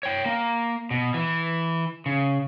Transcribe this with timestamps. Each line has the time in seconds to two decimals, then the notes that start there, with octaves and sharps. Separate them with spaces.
0.03 C#5 G5
0.26 A#3
0.91 B2
1.14 E3
2.06 C#3